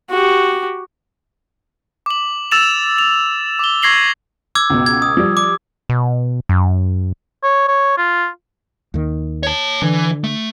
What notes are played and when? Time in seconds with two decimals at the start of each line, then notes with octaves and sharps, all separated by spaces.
0.10 F#4 G4
2.06 D6 F#7
2.51 E6 A6 E7 F7
2.98 F7
3.59 D6 G7
3.82 C#6 G#6 A#6 C7 F#7 G7
4.55 D6 E6 G#6
4.70 C#2 B2
4.86 G#6
5.02 D#6
5.17 F3 G3
5.37 D6
5.89 B2
6.49 F#2
7.43 C#5
7.68 C#5
7.98 F4
8.94 D#2 D#3
9.43 C#5 A5
9.82 D3 E3
10.24 A3